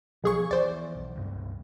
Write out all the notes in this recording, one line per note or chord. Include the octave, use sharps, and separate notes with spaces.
B1 F3 G#4 C#6
E2 E3 C5 D5
B1
C#2 G2